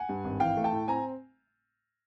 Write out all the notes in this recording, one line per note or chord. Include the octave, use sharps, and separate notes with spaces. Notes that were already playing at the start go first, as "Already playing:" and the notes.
Already playing: F#5 G#5
G2
G#1
E3 F5 G5
A3
G5 A5
A2
C4 G#5 A#5